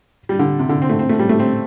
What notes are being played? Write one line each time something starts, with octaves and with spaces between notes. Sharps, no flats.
G3
D3
C3
D3
C4
A3
C4
A3
G3
A3
C4